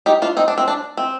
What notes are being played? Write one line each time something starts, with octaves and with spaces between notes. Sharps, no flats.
D#4 G4
D4 F4
C4 D#4
D4
C4
D4
C4